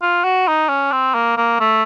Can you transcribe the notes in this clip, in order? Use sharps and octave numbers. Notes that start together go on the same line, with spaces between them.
F4
F#4
D#4
C#4
C4
A#3
A#3
A3